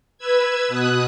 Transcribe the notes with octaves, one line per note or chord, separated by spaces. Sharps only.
B4 E6 G#6
B2 D#6 F#6